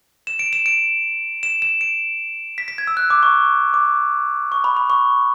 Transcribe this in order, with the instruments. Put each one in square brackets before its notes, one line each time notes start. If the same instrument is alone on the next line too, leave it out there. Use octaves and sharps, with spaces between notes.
[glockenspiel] E7
D7
E7
D7
E7
E7
D7
B6
B6
G#6
E6
F#6
D6
C#6
D6
C#6
B5
B5
C#6